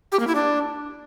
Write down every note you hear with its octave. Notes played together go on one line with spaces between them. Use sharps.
G4
A#3
E4
D4